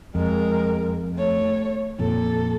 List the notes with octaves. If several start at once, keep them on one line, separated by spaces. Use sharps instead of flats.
F2 G#3 A#4
A3 C#5
F2 A#2 A4